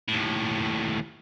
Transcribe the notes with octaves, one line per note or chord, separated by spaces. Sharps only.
D#2 A2